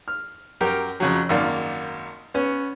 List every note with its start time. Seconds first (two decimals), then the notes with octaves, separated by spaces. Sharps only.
0.08 F6
0.61 F#2 G4 A#4 G5
1.00 F2 C#3 F#3
1.29 G#1 F#2 A#3 D5 F5
2.34 B3 C#4